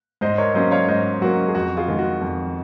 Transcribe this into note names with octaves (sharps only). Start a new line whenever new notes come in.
G#2 C5 D#5
A#4 C#5
F#3 A#3 C#4 C5 D#5
C#5 F5
G#2 C5 D#5
F#3 A#3 C#4 F#4
G#4
F2 F#4
F4 G#4
D#3 G#3
F#4
F2